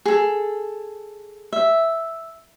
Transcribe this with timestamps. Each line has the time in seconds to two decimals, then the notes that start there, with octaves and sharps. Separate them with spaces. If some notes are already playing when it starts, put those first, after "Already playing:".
0.05 G#4 A4
1.53 E5